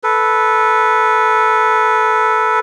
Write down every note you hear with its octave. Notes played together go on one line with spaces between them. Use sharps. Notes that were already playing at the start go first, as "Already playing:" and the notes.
A4 B4